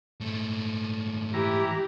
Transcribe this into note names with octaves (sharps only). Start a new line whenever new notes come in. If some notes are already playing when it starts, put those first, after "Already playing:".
G#2 A3
E3 G4 A#5